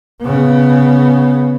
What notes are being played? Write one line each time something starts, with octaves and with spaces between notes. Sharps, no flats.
C#3 B3